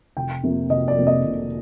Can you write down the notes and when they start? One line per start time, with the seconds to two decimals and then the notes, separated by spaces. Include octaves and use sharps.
0.17 F1 G5
0.43 F2 C3 F3 A#3
0.70 F1 D#5
0.88 D5
0.98 F2 C3 F3 A#3
1.07 D#5
1.25 F1